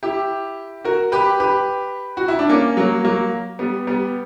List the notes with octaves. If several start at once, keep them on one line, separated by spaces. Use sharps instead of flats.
E4 G4
F#4 A#4
G4 B4
G4 B4
F#4
E4
D4
A#3 C#4
F#3 A#3
F#3 A#3
G3 B3
G3 B3